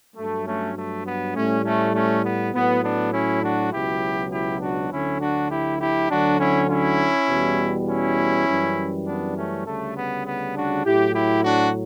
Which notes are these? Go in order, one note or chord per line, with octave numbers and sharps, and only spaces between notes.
G2 F#3 A3
A3 C#4
A3
B3
A2 G3 A3 C#4
A3 C#4
A3 C#4
B3
A2 F#3 B3
B3 D4
C#4 E4
D4 F#4
C#2 B2 F#3 E4 G4
E4 G4
D4 F#4
D2 D3 F#3 C#4 E4
D4 F#4
E4 G4
E4 G4
D2 D3 F#3 D4 F#4
C#4 E4
C#4 E4
E2 B2 G3
C#4 E4
F#2 E3 G3
B3 D4
A3 C#4
D2 C#3 G3 A3
B3
B3
D4 F#4
A2 F#3 E4 G4
E4 G4
D4 F#4